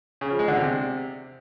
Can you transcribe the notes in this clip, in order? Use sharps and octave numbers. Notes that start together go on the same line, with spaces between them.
C#3
F3
G#3
D3
C3